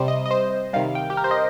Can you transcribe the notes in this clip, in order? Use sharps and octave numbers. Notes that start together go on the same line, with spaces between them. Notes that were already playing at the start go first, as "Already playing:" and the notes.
Already playing: C3 G3 C5
D#5
D#5
C5
C3 D#3 G3 F5
G5
G4
A#4
C5
D#5